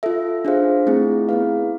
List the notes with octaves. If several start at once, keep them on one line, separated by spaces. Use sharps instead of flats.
F4 A4 E5
D4 F4 G#4 C5 F5
A3 C4 E4 G#4
B3 E4 G#4 B4 F5